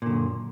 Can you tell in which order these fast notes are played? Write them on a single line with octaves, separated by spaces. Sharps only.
A#2 D3 F#2